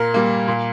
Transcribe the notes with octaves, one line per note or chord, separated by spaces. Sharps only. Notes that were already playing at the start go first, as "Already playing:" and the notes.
Already playing: A#2 A#4
G3 A#3
A#2